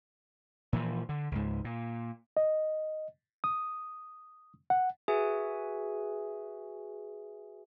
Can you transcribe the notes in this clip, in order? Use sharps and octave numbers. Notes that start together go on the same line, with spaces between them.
A#2 E3 F3
D3
C#2 G#2
A#2
D#5
D#6
F#5
F#4 G#4 B4 E5 G#5